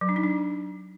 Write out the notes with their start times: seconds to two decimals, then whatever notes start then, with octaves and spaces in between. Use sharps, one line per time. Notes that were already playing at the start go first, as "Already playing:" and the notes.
0.01 F#3
0.09 D4
0.16 D#4
0.24 D4